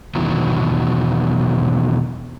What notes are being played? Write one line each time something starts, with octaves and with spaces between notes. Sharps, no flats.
E2 B2 D#3 E3 F#3